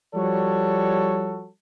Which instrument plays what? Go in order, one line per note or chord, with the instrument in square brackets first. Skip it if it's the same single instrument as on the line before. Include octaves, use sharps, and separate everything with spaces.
[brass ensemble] F3 G3 F#4 A4 C#5